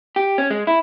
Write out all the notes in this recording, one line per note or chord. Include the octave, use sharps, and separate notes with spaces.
G4
C#4
G#3
E4